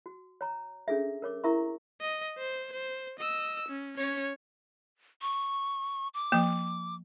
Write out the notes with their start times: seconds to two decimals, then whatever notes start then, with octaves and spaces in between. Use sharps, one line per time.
0.06 F#4
0.41 C#5 A#5
0.88 C#4 D4 G#4 A4 E5
1.22 A#4 C#5 D6
1.44 E4 A#4 E5 A#5 C#6
2.01 D#5
2.38 C5
2.72 C5
3.19 D#5 E6
3.68 C#4
3.97 C#4 C#5
5.22 C#6
6.14 D6
6.32 F3 A#3